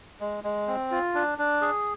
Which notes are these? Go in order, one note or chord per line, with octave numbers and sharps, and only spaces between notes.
G#3
G#3
C4
F4
D4
D4
G#4